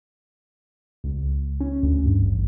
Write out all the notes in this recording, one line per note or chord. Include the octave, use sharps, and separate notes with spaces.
C#2
C#4
D2
G2
A1